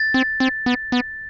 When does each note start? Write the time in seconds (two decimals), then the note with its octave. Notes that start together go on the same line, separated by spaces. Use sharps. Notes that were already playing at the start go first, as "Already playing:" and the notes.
Already playing: A6
0.14 C4
0.40 C4
0.66 B3
0.92 B3